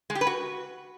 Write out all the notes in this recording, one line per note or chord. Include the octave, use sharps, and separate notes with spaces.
G#3
G4
B4
F#4